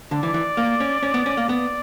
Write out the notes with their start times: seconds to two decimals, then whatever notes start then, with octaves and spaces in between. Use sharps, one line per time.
0.11 D3 D5
0.23 E3
0.34 E3
0.57 A#3
0.80 C#4
1.03 C#4
1.14 B3
1.26 C#4
1.37 A#3
1.49 B3 D5